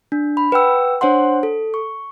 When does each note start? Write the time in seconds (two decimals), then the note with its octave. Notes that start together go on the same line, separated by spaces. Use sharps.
0.12 D4
0.37 B5
0.52 B4 F#5 G5 E6
1.01 D4 C5 C#5 F#5 C6
1.43 A4
1.74 C#6